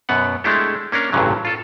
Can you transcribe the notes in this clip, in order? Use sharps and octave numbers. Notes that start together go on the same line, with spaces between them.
F#2 B2 B3 F#5
G#3 A3 D4 E4 G4 A4
A#3 C#4 D4 A#4
A1 G2 A#2 C#3 F#3
F4 A4